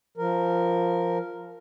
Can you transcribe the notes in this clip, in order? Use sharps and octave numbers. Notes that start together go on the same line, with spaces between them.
F3 A#4